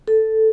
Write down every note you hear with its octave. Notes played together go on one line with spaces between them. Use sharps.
A4